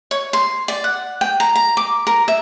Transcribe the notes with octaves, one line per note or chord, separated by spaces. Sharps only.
C#5
C6
D5
F#5
G5
A#5
A#5
D6
A#4
E5